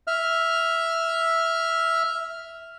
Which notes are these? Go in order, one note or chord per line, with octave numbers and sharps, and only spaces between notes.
E5 F6